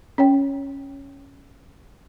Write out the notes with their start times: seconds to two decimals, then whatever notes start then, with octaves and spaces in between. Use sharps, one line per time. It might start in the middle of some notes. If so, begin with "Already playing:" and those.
0.18 C#4 C#5 G5